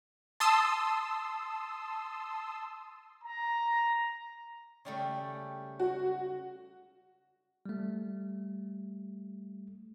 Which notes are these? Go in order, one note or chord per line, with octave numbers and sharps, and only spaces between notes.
A5 C6 D#6 E6
A#5
C#3 G3 A3
F#4
G3 A3